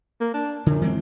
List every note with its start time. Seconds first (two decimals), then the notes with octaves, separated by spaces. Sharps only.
0.20 A#3
0.34 D4
0.66 F#2 D3
0.81 E3 G#3 C4